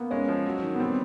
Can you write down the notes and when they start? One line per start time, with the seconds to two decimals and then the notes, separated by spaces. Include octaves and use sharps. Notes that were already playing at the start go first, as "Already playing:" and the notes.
Already playing: A#3 B3
0.11 G#3 C#4
0.28 F3
0.46 F#3
0.63 D#3
0.74 B3
0.80 G3 C4